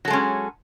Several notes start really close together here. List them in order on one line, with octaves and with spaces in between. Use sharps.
F#3 A4 G#3 C#4